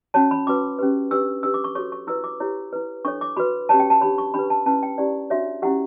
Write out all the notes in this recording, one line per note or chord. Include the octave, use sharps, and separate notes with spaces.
C#4 F#4 C#5 A5
B5
C#4 F#4 B4 D6
C#4 G4 B4
D4 G4 B4 E6
D4 G4 B4 E6
D6
C#6
F#4 A4 C#5 C#6
C#6
E4 B4 E6
D6
E4 G4 C#5
E4 B4
D4 A4 C#5 C#6
D6
F#4 B4 B5
C#4 G4 C#5 A5
G5
A5
D4 G4 C#5 B5
C#6
D4 G4 B4 B5
A5
C#4 E4 B4 A5
G5
C#4 E4 G4 D5
D4 F#4 C#5 E5
C#4 E4 G4 F#5